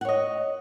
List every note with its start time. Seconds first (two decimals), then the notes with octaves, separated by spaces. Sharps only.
0.01 F#5
0.05 C#5
0.09 D#5